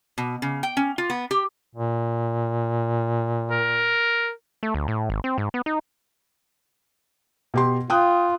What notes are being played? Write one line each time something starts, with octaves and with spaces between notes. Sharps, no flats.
B2
C#3
G5
C#4
F4
B3
G4
A#2
A#4
A3
D2
A2
G#1
C4
G#2
B3
D#4
B2 G4 C6
F4 G5 D#6 F#6